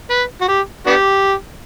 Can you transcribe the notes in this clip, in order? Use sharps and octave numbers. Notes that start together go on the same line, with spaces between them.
B4
F#4
G4
B3 D4 G4